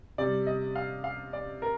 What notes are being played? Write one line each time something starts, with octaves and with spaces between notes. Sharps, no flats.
C3 G3 D5
D#5
F5
F5
D5
A#4